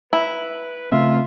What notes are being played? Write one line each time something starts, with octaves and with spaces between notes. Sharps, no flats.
E4 B4
C#3 A3 C4 F4 E5